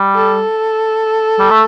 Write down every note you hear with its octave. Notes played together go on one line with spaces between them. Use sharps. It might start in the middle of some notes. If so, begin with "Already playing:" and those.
Already playing: G3
A4
G3
A3